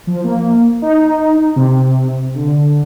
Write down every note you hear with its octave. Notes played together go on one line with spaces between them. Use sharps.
F3
A#3
D#4
C3
D3